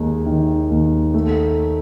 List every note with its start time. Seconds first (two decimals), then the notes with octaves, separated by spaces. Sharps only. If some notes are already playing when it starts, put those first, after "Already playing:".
Already playing: D#2 G#3
0.26 D#3
0.70 D#2
1.14 A3